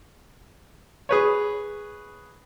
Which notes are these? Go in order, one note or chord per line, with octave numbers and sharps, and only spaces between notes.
G#4 B4 C#5